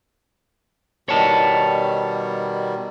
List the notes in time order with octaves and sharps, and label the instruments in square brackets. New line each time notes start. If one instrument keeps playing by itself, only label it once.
[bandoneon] B2 D#3 G3 [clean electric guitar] C#5 A5